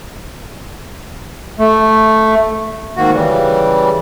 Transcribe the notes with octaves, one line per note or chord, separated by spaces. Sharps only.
A3
G#2 D#3 A#3 F#4
C#3 E3 G3